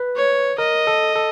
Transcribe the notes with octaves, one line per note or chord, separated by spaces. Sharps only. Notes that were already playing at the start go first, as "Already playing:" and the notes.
Already playing: B4
C#5
A#4 D#5
A4
A4